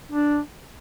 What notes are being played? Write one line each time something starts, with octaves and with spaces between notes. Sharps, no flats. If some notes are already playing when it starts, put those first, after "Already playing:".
D4